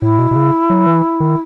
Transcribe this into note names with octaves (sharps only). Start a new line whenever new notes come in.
A2 E4
B2
B2
C#3
F#3
E3
D#3